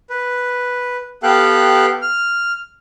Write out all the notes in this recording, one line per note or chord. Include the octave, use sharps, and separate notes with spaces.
B4
B3 G4 A4 F5 G5 F#6
F6